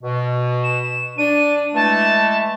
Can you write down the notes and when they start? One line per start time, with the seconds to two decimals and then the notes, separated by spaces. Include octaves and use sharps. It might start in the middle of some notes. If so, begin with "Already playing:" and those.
0.03 B2
0.63 E7
1.18 D4 D#7
1.75 E3 G#3 A3 A5